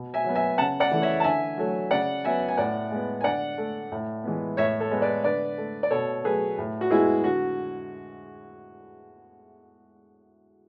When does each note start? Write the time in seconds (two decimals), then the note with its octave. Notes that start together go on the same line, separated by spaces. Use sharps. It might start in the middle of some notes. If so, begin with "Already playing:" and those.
Already playing: B2
0.14 E5 G#5
0.24 F#3 B3
0.35 E5 G#5
0.58 C#3 F#5 A5
0.80 D5 F#5
0.91 E3 A3
1.02 C#5 E5
1.20 A5
1.24 D3 E5 G#5
1.58 F#3 A3
1.91 C#3 D5 F#5
2.24 F#3 B3 E5 G#5
2.48 G#5
2.57 A2 D5 F#5
2.91 G#3 B3
3.21 G#5
3.24 D3 D5 F#5
3.58 A3
3.92 A2
4.24 E3 G#3 B3
4.57 A2 C#5 E5
4.80 A4 C#5
4.91 G#3 B3
5.02 B4 D5
5.24 D3 B4 D5
5.58 A3
5.83 D5
5.90 B2 A4 C#5
6.24 F#3 A3 G#4 B4
6.58 A2
6.81 F#4
6.90 G#3 B3 E4 G#4
7.24 D3 F#4